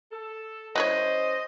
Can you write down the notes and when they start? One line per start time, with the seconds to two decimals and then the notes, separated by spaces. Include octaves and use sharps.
0.12 A4
0.76 F#3 C#4 E4 C5 C#5 D#5